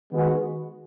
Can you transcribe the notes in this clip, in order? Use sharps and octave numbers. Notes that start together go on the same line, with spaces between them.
D#3 G#3 B3 F#4